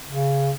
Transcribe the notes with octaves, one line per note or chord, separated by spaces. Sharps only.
C#3